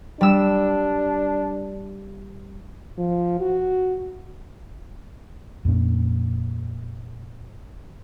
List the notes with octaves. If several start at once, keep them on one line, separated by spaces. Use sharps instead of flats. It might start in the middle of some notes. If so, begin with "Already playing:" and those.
G3 D4 E6
F3
F#4
F2 A#2 C#4